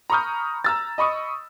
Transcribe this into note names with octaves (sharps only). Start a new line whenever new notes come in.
A#5 B5 C#6 D#6 F6 G6
A#5 E6 A6
D#5 B5 C#6 D#6